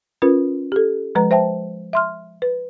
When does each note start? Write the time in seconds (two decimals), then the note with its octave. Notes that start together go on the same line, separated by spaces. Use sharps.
0.22 C#4 F4 A#4 B4
0.72 G4 A4
1.15 F3 G#3 B4 A#5
1.31 C5 E5 G5 A5
1.93 E5 C6 F6
2.42 B4